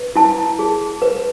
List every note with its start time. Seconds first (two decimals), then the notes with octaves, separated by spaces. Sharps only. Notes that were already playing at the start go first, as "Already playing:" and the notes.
Already playing: B4
0.15 E4 A5
0.59 G#4
1.02 B4